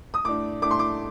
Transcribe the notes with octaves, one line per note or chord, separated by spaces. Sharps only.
D#6
A2 A3 D4 D6
A2 A3 D4 D6
C6
D6